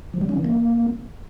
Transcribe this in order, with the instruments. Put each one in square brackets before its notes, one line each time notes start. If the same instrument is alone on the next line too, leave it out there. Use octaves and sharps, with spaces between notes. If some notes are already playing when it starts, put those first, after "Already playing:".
[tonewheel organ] F3
G3
C#4
E3
A#3